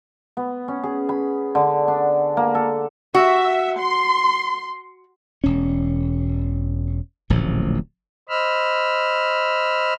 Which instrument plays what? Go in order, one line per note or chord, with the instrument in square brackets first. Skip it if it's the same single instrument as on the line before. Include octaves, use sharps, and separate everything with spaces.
[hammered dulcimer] B3
C#4
G#4
B5
D3
D4
A#3
A4
[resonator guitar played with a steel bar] F#4 [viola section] E5
[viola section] C6
[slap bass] E1 C#4
D1 A1 A#2 F3
[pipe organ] C5 D#5 B5 E6 F6